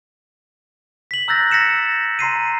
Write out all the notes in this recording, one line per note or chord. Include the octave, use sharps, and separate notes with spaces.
B6 F#7
A#5 E6 F#6 G6 A6 A#6
A#6 B6 C#7 E7
A#5 C6 C7 D#7